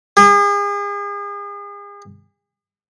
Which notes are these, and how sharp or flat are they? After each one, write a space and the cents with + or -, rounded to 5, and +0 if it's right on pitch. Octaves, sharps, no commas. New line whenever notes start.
G#4 -40